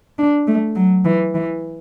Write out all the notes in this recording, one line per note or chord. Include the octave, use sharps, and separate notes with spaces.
D4
A3
F#3
E3
E3